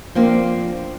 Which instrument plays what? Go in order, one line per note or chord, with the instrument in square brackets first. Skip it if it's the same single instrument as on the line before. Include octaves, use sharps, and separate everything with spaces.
[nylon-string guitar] F3 A#3 C4 D4